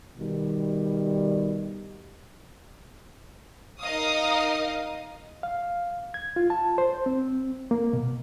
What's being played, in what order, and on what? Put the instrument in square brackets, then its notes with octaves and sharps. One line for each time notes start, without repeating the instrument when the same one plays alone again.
[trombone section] B2 D#3 G3
[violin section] D#4 A#4 D#5 F5 D#6
[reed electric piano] F5
G#6
F4
A5
C5
C4
A#3
B2